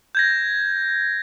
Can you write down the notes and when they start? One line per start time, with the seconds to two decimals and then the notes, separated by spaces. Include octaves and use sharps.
0.15 G6 G#6 A#6